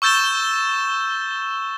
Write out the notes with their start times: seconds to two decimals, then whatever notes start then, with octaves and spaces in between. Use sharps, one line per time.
0.02 C#6 E6 G6 A6 E7 G7